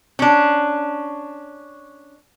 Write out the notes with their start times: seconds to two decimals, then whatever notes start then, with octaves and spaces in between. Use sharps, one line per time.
0.19 C#4 D4